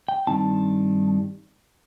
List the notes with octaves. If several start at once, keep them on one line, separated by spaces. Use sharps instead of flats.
G5
G2 D#3 G3 C4 D#4 A5